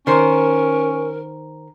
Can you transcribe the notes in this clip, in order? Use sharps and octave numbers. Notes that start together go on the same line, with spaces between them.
D#3 C#4 A#4 C5